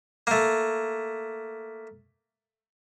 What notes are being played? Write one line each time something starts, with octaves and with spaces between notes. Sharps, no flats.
A3 A#3